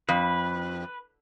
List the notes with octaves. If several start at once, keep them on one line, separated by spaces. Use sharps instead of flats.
F2 B4